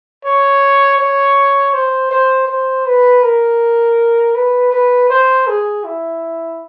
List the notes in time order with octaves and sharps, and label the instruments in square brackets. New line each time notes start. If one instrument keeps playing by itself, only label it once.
[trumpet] C#5
C#5
C5
C5
C5
B4
A#4
B4
B4
C5
G#4
E4